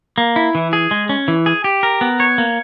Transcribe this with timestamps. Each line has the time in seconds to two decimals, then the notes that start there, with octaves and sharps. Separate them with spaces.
0.18 A#3
0.36 E4
0.55 E3
0.73 G#4
0.91 G#3
1.09 C#4
1.28 E3
1.46 G#4
1.64 G4
1.83 A#4
2.01 B3
2.20 C#5
2.38 A#3